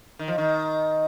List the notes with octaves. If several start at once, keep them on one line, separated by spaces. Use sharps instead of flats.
D#3
F3
D#3